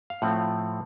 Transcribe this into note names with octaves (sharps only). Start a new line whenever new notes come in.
F5
A2 F3 A3 C4 F#5